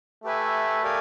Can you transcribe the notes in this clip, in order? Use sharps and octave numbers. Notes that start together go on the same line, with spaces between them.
A3 G4 B4 E5 G#5
G4 A#4 D5 F5 G#5